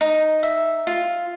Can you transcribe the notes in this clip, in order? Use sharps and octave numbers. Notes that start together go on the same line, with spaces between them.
D#4
E5
F4